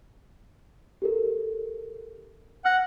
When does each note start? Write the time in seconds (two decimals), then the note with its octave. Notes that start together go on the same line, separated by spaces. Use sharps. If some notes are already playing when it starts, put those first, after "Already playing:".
1.02 G4 A4 A#4
2.65 F#5 F6 A#6